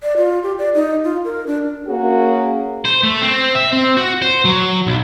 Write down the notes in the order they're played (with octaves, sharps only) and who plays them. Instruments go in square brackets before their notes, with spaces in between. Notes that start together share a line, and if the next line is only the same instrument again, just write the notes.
[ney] D5
F4
G4
D5
D#4
F4
A#4
D4
[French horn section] A#3 C#4 F#4 G#4
[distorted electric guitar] C5
A3
C4
E5
C4
F#4
C5
F#3
B1